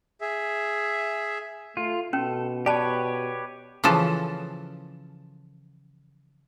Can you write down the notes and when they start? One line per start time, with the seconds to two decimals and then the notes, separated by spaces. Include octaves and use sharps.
0.21 G#4 E5
1.77 A3 F4
2.13 B2 C#4 A4
2.66 G4 B4 C#5 D5 A5
3.84 C#3 E3 F3 A4